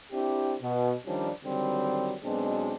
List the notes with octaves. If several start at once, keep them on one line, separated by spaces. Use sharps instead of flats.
C4 D4 E4 G4
B2
D#3 F3 G3 C#4 D4
D3 D#3 F#3 G3 C4
B1 B2 G#3 C4 D4